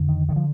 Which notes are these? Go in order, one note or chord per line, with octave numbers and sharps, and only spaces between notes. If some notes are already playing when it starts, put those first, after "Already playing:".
Already playing: F2 D3
D#3
D3 D#3
F3